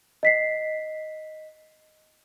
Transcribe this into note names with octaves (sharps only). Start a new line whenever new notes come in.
D#5 B6 C7